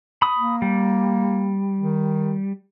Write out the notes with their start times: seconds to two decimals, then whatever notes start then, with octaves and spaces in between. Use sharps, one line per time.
0.22 B5 D#6
0.37 A#3
0.62 G3
1.80 D#3